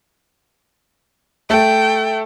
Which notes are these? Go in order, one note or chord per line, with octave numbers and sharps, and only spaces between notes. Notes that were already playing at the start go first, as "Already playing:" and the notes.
A3 A4 G5